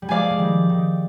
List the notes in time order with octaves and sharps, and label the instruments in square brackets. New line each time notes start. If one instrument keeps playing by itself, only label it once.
[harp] G3
[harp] F3 G#3 [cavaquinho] D5 F5 G#5
[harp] A#3
G#3
D#3 G3
D#3